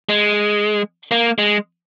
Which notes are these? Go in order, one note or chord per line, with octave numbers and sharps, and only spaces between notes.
G#3
A#3
G#3